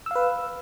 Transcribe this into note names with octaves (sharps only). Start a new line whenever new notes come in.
B4 F5 E6